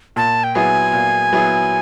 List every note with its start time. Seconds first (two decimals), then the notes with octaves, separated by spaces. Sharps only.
0.16 A#2 A5
0.44 G5
0.55 F#3 B3 E4 G#4 G#5
0.93 A#2
1.33 F#3 B3 E4 G#4